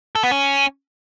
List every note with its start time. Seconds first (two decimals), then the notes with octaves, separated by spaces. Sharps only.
0.15 A4
0.23 B3
0.31 C#4